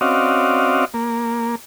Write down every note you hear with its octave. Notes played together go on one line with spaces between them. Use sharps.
C4 C#4 F#4 D5 D#5 F5
A#3